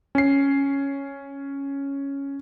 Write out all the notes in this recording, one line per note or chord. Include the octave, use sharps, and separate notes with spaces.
C#4 C7